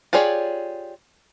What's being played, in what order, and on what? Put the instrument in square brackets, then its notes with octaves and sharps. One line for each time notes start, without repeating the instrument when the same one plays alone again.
[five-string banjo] F4 G4 G#4 C#5 D5